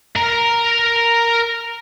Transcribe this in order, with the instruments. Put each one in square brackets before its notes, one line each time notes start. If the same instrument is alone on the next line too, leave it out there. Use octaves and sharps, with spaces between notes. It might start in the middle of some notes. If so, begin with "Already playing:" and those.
[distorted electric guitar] A#4 A#5